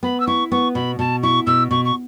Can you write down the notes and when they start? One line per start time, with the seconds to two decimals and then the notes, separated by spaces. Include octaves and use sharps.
0.03 B3 B5
0.20 E6
0.27 E4 C#6
0.51 B3 C#6
0.75 B2 B5
0.99 B2 A5
1.23 E4 C#6
1.46 B2 E6
1.70 B2 C#6
1.85 C#6